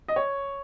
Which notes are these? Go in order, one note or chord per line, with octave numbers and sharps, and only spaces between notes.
D#5
C#5